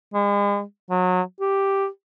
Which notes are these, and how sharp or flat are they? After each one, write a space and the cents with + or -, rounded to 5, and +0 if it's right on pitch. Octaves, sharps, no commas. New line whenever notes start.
G#3 -40
F#3 -25
G4 +0